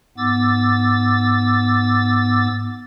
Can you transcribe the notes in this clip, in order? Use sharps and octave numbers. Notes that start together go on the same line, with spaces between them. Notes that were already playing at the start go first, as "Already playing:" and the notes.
G#2 B3 D6 E6 A6